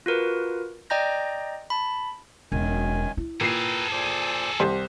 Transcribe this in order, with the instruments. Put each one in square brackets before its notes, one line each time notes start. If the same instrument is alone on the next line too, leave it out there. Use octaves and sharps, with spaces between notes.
[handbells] F4 F#4 A#4 B4
D5 D#5 G5 A#5 G6 A#6
A5 B5
[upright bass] E1 [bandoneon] F#2 D#3 G#5
[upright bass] E4
[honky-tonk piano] A#2 C7 [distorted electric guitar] G#4 A4 [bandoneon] B4 G5 A#5
[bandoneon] A#2 C5 D6
[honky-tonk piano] D#7
C2 G4 C5